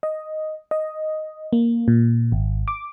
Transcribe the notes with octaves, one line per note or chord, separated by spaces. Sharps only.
D#5
D#5
A#3
A#2
G#1
D6